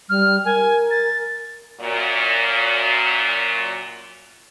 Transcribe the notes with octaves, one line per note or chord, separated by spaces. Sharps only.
G3 F6
A#4 G#5
A6
F#2 A#2